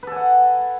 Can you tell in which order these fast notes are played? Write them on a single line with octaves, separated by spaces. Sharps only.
B4 A4 G#5 F#5